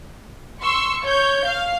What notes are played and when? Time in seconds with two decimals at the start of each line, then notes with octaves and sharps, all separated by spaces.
0.63 C6 C#6 E6
1.04 C#5 G6
1.46 F5